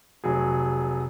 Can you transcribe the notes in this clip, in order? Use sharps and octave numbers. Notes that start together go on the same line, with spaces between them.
F1 F#3 G#4